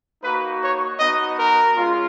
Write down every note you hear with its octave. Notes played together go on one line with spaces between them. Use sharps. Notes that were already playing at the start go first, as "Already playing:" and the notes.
A#3 D#4 F#4 B4
C#5
B3 D#4 F#4 D#5
A#4
G#3 C#4 F4